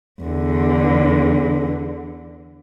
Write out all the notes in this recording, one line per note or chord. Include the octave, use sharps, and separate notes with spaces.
E2 D3